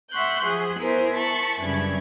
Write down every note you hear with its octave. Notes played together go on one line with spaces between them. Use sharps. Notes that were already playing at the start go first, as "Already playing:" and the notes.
E5 F#5 C6 C#6 F#6 G6
F3 G#4
B3 E4 A#4 C5 G#5
A5 B5 C#6 F#6
F#2 C#3 E3 G3 D4 G#6